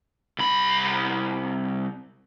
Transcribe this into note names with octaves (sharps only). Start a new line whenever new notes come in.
C2 B5